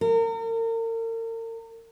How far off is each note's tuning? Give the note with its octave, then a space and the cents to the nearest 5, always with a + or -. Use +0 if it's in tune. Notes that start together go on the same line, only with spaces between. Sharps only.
A#4 -40